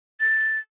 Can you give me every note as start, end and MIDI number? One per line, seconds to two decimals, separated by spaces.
0.20 0.59 93